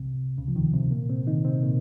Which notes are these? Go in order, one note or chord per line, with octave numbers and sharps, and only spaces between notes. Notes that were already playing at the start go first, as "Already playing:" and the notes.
Already playing: C2 C3
C#2 C#3
F3
D#2 D#3
C3 C4
A#2 A#3
C3 C4
D#3 D#4
C3 C4
A#2 A#3